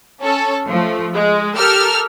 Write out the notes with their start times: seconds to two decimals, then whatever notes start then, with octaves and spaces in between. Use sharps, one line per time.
0.22 C#4 A4
0.67 F3 A3
1.14 G#3
1.56 G4 A4 A#4 E6 F6